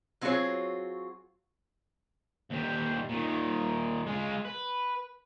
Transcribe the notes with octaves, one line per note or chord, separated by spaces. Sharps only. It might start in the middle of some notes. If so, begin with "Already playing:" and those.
F#3 C4 F4 F#4 G#4 C#5
D#2 G3
A#2 D#3
G#3 F4
B4